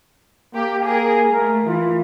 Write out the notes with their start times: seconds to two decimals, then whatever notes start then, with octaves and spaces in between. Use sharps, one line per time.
0.55 A#3 G4
0.85 G#4 A#4
1.32 A3 A#4
1.67 E3 F4